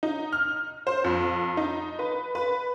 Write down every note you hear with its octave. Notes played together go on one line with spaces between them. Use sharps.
D#4
F6
C5
F2
D#4
B4
B4